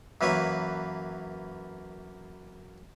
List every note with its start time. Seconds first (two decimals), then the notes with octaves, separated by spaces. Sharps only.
0.21 F#2 E3 A#3 B4 C#5